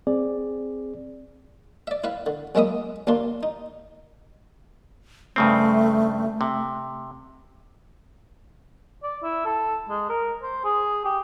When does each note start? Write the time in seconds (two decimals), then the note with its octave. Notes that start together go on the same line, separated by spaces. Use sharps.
0.07 C4 G#4 D5
1.87 D5 E5
2.04 E4 B4 F5
2.26 D3
2.55 F#2 G#3 A#3 E5 B5 D#6
3.07 D#2 A#3 D4 F4 C6
3.43 D#4
5.36 G2 C#3 A3 C4
6.41 C3
9.03 D5
9.23 E4
9.46 A4
9.89 G#3
10.09 A#4
10.42 C5
10.64 G#4
11.05 G4